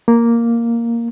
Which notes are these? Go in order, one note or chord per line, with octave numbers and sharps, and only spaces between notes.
A#3